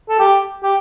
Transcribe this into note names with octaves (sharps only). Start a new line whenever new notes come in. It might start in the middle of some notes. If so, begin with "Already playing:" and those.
A4
G4
G4